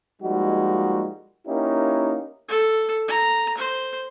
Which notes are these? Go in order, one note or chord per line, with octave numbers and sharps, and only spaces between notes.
F3 G3 G#3 A#3 D#4 F#4
A#3 C#4 D#4 E4 G4 A#4
A4
A#5
C5